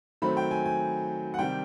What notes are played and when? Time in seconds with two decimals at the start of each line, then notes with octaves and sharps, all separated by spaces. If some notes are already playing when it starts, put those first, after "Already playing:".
0.22 D#3 F#3 A3 C4 B5
0.37 G5
0.51 G#5
0.66 G#5
1.34 F#5
1.39 C3 D#3 G3 G5